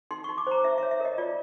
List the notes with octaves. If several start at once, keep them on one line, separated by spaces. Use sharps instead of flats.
D#4 C6
D#4 C#6
D6
C5 A#5
D#4 E5
E5
C#5
E5
A#4 D#5
F4 D5